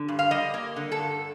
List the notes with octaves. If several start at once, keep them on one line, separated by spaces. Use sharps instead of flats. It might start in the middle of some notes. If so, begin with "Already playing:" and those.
Already playing: D3
G2
F5
G3 D#5
A#3
D3
A4
G2